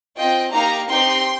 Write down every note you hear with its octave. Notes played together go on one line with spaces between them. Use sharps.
C4 F4 D#5 G5
A#3 D#4 G4 F5 A#5
C4 D#4 G4 G5 C6